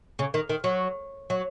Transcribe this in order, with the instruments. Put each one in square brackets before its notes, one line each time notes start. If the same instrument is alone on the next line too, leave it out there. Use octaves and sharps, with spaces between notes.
[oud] C#3
D#3
D#3
F#3
F#3